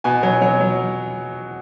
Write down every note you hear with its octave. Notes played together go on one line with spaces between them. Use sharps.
B2 G#5
F#3
F#3
F#3